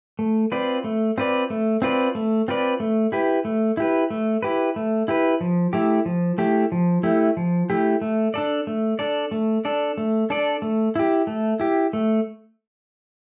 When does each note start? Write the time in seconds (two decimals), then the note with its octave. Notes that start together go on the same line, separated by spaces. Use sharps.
0.19 A3
0.52 C4 F4 B4 D5
0.84 A3
1.18 C4 F4 B4 D5
1.50 A3
1.82 C4 F4 B4 D5
2.15 A3
2.48 C4 F4 B4 D5
2.80 A3
3.12 E4 G4 B4
3.45 A3
3.77 E4 G4 B4
4.10 A3
4.43 E4 G4 B4
4.76 A3
5.08 E4 G4 B4
5.41 F3
5.73 A3 E4 G4
6.06 F3
6.38 A3 E4 G4
6.72 F3
7.03 A3 E4 G4
7.37 F3
7.70 A3 E4 G4
8.01 A3
8.34 D4 A4 D5
8.67 A3
8.99 D4 A4 D5
9.31 A3
9.65 D4 A4 D5
9.98 A3
10.30 D4 A4 D5
10.62 A3
10.96 E4 G4
11.27 A3
11.60 E4 G4
11.93 A3